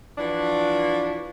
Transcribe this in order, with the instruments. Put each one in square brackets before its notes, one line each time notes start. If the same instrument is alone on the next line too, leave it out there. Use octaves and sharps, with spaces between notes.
[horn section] E3 F3 D4 F#4